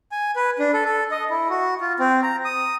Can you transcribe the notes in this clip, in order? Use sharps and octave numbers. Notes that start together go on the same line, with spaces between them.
G#5
B4
D4
A4
A4
D#5
E4
F#4
F4
C4
A#5
D#6